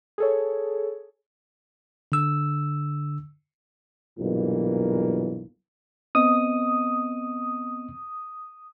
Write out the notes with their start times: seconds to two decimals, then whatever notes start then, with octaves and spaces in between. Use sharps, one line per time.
0.18 G#4 A4 C#5
2.12 D3 E6
4.19 B1 G2 A#2 E3 A#3
6.15 B3 C4 D#5 D#6